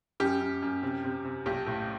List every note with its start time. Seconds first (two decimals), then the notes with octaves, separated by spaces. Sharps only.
0.20 F#2 G4
0.40 F#2
0.62 F#2
0.83 C3
1.04 C3
1.25 C3
1.46 B1 G4
1.66 A2